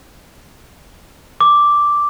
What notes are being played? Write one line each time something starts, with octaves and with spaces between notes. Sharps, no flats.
D6